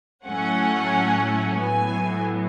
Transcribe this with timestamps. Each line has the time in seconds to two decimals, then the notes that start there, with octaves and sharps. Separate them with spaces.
0.25 A2 F#3 A3 C#4 F#5
1.57 A2 F#3 B3 G#5